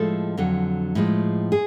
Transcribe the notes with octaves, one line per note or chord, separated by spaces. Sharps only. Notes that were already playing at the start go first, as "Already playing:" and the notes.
Already playing: A2 F3 G#3 A4
F2 D3 F#3
A2 F3 G#3
G#4